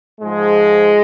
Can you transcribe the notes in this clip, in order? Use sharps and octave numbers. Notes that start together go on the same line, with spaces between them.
G#2 F3 G#3